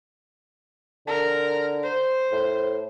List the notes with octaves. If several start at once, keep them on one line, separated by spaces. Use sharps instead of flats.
D3 A#4
C5
A2